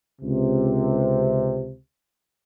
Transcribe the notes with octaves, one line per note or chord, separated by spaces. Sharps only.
C#2 C3